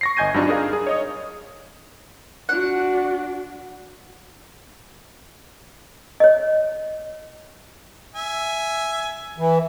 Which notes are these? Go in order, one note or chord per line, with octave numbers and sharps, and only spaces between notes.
C#6 A#6 C7
G1 D#5 G#5 G6 G#6 D#7
G2 F#3 C4 D4 D#4 F4
D4 D#4 G#4 A#4 F5
G#4
C#5 D#5 D#6
D4 F#4 F#5
C#5 D#5
E5 G#5
E3